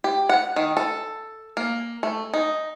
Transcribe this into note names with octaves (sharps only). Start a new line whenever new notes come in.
G4
F#5
D#3
A4
A#3
A3
D#4